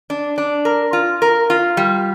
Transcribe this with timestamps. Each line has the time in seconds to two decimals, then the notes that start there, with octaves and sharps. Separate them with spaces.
0.10 D4
0.38 D4
0.65 A#4
0.93 F4
1.22 A#4
1.50 F4
1.77 G3